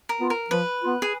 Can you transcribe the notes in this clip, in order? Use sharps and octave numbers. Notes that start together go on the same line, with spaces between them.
A#4
B3 F4
A#4
F3 B4
B3 F4
G#4